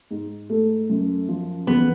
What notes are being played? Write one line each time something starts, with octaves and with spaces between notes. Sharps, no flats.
G#2
A3
F#2
F3
E2 B3